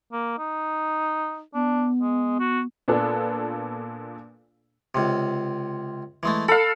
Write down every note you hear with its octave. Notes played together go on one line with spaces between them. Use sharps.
A#3
D#4
B3 D4
G#3
F#4
A#2 B3 D4 F4 A4
C#2 C3
E3 G#3 A3
A4 F5 B5